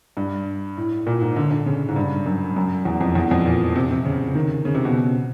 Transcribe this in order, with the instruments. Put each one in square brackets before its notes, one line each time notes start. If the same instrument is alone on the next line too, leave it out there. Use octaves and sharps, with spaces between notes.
[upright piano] G2
A2
A#2
G#2
D3
D3
C#3
G#2
G2
F#2
F#2
E2
F2
E2
F2
A#2
C3
C3
C#3
D#3
C#3
C3
B2